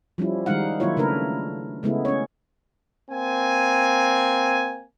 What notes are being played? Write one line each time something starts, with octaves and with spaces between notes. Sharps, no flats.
F3 G3 C#4 E4
D#3 G3 G#3 D#4 F5 F#5
D#3 F#3 A#3 E4 F4 C#5
C#3 A3 D4 A#4 B4
C#3 G#3 A3 B3 E4
C#4 C#5
A#3 C4 G#5